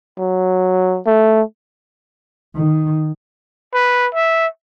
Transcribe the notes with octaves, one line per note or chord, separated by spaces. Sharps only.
F#3
A3
D#3
B4
E5